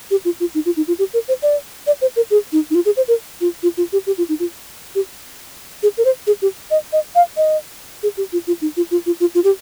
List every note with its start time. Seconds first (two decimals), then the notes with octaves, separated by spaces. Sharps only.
0.11 G4
0.25 F4
0.40 F4
0.55 D#4
0.66 F4
0.77 D#4
0.88 F4
0.99 G4
1.14 A#4
1.28 C5
1.43 D5
1.87 D5
2.01 C5
2.16 A#4
2.31 G#4
2.52 D#4
2.71 D#4
2.75 F4
2.86 G#4
2.97 C5
3.08 A#4
3.41 F4
3.63 F4
3.77 F4
3.93 G4
4.07 G4
4.18 F4
4.29 D#4
4.40 F4
4.95 G4
5.83 G#4
5.98 A#4
6.05 C5
6.27 G#4
6.42 G4
6.71 D#5
6.93 D#5
7.15 F5
7.37 D#5
8.03 G#4
8.17 G4
8.33 F4
8.47 F4
8.61 D#4
8.77 F4
8.91 F4
9.06 F4
9.20 F4
9.35 F4
9.44 G4